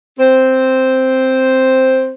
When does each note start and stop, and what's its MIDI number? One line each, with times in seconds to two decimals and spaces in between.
0.19 2.12 60
0.19 2.12 72